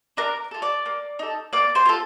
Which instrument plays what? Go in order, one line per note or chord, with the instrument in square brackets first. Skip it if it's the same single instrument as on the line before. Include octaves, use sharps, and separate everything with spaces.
[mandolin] D4 A#4 A#5
F4 A4
D5 D6
A#3
D#4 A4
A#3 D5 D6
C5 C6
F4 A4